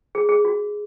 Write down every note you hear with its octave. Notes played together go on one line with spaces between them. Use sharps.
G#4
G#4
F#4